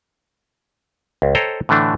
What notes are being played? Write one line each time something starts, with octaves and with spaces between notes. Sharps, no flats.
C#2
A4 C5 C#5 D#5 G5 A#5
A2 D3 E3 A3 D4